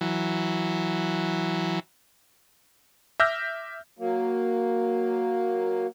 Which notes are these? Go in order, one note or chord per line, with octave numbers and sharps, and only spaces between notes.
E3 F#3
E5 D6 E6 F6 G6 A#6
F#3 A#3